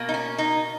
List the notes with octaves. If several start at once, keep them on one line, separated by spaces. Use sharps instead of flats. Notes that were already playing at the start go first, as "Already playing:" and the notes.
Already playing: B2 A#3
D#4
C#4
D#4